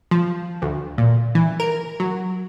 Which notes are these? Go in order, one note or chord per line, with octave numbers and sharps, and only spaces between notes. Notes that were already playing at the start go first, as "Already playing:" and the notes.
F3
D2
A#2
E3
A#4
F#3